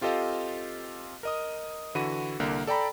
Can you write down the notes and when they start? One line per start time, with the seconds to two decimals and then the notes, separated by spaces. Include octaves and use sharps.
0.01 C4 F4 G4 A4 D#5 F5
1.23 A#4 D#5 D#6
1.95 D3 E3 F#4 B5 D#7
2.40 C2 D3 A#3
2.67 A4 D5 G5 A#5 B5